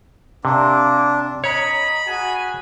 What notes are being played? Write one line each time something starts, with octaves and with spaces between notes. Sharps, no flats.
C3 A#3 D4 D6
C#5 D#5 A#5 B5
F#4 G#4 G#5